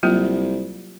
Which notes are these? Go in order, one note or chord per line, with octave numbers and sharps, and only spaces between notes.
C2 F#3 A#3 F4